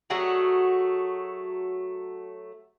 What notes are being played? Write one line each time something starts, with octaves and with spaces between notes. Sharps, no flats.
F#3 A3 F#4 G#4